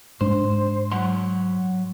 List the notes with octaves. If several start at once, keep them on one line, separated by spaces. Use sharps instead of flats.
G#2 G#3 D4 C5
F#3 F#5 C6